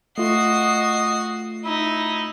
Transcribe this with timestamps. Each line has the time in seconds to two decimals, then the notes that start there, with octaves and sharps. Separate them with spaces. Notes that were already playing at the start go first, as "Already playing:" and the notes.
0.18 A3 F4 F#4 D#5 C7
1.65 D#4 E4